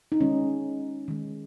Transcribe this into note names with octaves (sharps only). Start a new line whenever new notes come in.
D#4
D#3 G#3 C#4
D#3 G#3